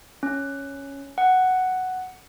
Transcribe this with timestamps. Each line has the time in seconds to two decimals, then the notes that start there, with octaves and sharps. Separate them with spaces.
0.23 C#4
1.18 F#5